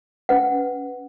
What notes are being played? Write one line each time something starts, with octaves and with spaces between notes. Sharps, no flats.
C#4 B4 F#5